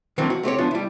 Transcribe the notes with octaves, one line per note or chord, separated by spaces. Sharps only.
D#3 E3 F#3 A#3 C4 D4
F#4
A3 C4 G4 C#5
F3 B3 C#4 D4 F4
G3 E4